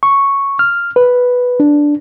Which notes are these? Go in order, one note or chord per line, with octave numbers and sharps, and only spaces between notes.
C#6
F6
B4
D4